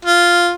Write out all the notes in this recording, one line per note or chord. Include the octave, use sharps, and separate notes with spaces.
F4